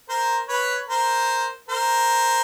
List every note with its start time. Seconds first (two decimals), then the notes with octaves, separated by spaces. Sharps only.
0.09 A#4 C5
0.48 B4 C#5
0.89 A#4 C5
1.68 A#4 C5